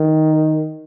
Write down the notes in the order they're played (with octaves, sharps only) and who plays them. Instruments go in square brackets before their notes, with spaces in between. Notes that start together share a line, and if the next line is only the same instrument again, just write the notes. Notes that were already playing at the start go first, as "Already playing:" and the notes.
Already playing: [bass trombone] D#3